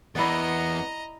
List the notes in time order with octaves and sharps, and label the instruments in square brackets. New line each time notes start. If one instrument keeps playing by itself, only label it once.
[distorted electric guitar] E2 [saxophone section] A#3 B3 [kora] E4 D5 [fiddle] D#5 A#5